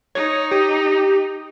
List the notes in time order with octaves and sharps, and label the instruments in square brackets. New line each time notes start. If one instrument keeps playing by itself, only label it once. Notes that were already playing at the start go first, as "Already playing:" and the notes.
[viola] D#4 [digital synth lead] C#5
[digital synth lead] G4